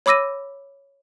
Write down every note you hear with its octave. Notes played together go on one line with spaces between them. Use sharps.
C#5 B5 D6 E6 A#6 D#7